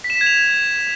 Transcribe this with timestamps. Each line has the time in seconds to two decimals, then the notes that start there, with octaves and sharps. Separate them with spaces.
0.04 B6
0.10 E7
0.15 B6
0.21 G#6
0.26 F7